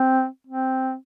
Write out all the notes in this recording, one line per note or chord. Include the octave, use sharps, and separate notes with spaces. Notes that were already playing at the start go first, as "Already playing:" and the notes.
Already playing: C4
C4